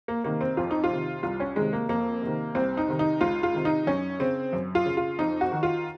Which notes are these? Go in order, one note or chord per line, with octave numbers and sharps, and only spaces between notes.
A#3
C3 D#3 A#3
C4
F2 F4
D#4
F4
C3 D#3
C2 F4
C#4
C3 D#3 G#3
A#3
F2 A#3
C3
D#3
C2 C4
D#4
C3 D#3
D#4
C#2 F4
F4
C3 D#3
D#4
F#2 C#4
C#3 C4
F#2
F4
C#3
F4
F2 D#4
F#4
D#3
F4